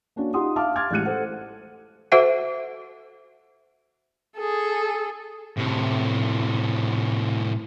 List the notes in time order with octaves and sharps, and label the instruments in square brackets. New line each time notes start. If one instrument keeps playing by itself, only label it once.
[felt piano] A#3 C#4 D4 F#4
D#4 F4 G4 F#5 C6 D#6
E5 F5 A5 D6 F6
C6 D6 F6 G#6 A6
A1 G#3 G4 F#6 C#7 D#7
A4 C5 F#5
[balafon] F#4 A4 C5 E5 F#5
[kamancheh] G#4 A4
[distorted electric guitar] A2 C3